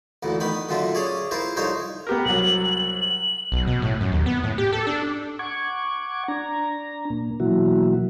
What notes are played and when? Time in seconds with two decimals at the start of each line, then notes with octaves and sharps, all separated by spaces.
0.23 A1 D2 A#2 E3
0.40 D#3 B3 G5 B5
0.69 F#2 A#2 D3 F4 E5
0.95 C#4 G#4 C#5 D5
1.31 E4 F4 A#4 C5
1.56 C2 F2 D#4 C5 C#5
2.07 B3 G4 A#4
2.25 C2 F#3 F#7
2.99 F#7
3.52 B1
3.67 B2
3.82 A2
4.01 F#2
4.12 D#2
4.26 B3
4.43 A2
4.58 G4
4.73 A4
4.87 D4
5.39 F#5 C#6 D6 G#6
6.28 D4 A#5
7.10 A#2 A#3
7.40 B2 E3 F#3 A#3 E4 F#4